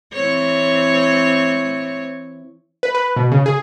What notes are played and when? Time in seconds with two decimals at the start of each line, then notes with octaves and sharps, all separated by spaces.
0.13 E3 C4 C#5
2.83 B4
2.95 B4
3.17 B2
3.32 C#3
3.46 G#4